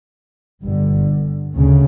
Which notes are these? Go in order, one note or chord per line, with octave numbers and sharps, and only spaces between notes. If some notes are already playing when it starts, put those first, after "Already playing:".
G1 G2 D3
D2 C#3